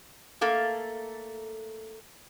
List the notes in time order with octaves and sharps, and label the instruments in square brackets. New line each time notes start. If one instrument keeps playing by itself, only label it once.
[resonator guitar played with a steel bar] A3 A#3 A4 F5